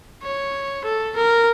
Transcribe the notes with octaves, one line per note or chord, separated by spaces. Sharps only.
C#5
A4
A#4